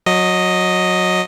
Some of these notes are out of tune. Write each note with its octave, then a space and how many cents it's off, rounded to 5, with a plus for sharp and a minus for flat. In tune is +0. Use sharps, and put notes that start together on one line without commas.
F#3 -20 D#5 +0